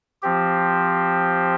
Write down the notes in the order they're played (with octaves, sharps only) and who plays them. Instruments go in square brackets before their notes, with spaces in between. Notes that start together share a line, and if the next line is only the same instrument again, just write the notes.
[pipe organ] F3 C4 G4